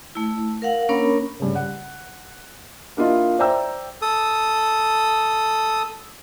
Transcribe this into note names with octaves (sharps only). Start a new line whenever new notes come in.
A3 E4
A#4 F5 F#5
A#3 C#4 D4 A#4 C#5 B5
G2 C#3
F#5
A#3 D4 E4 F4 D#5
C5 D5 E5 G5 A#5 E6
A4 D#6